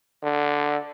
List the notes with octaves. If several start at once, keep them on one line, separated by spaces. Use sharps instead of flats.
D3